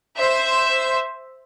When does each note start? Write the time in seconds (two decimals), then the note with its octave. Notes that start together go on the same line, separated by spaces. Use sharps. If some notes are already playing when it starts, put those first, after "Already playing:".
0.19 C5 E5